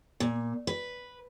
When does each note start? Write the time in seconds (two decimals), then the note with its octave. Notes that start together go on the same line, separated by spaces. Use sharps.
0.20 A#2
0.67 B4